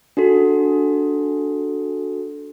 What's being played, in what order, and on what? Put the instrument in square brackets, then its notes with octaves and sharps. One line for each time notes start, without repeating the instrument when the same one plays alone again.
[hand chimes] D4 F#4 A4